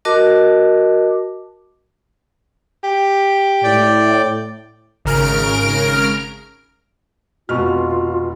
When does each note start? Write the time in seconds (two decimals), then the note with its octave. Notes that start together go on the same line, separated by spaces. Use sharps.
0.05 F#4 A#4 D#5 A5 D6
2.84 G4
3.64 A2 D5 G5
5.05 G#1 C#3 A#4 F6 D7
7.49 F1 B2 F4 F#4 C#6 F6